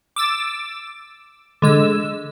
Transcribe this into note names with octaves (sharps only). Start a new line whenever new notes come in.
D6 E6 A6
D3 G#3 E6